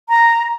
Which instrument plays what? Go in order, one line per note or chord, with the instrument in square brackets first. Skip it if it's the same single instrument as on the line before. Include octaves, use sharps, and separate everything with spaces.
[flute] A#5